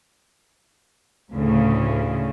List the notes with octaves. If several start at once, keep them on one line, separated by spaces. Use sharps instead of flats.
D2 A2 C#3